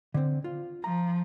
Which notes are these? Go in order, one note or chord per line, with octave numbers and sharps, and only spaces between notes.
D3 C4
F4
F3 A#5